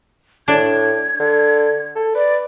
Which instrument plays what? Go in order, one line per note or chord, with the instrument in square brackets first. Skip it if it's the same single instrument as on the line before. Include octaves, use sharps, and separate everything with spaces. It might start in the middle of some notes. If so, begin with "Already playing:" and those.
[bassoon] A2 [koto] D4 [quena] G#6
[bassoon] D3
A4
[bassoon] B4 [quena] D5